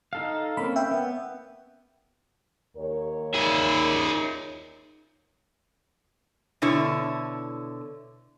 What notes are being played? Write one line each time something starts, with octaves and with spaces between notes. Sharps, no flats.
D#4 A4 F5
A#3 C4 C#4 B5
E5 G5
B3
D#2 A#4 C#5
D#4 G#4 D5 E5
B2 D3 E4 C#5